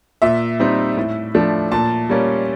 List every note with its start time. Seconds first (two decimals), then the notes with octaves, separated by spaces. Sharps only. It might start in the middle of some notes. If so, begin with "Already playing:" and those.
0.22 A#2 E5
0.59 G3 C4 D#4
0.97 A2
1.35 F3 A3 D4
1.72 A#2 A5
2.09 G3 A#3 C#4